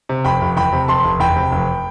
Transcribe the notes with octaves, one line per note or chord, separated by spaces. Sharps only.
C3
F1 G5 B5
F1
E2 G5 B5
C3
F1 A5 C6
F1
E2 G5 B5
C3
F1